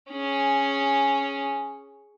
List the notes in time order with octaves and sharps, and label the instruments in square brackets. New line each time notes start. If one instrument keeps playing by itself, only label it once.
[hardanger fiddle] C#4 G#4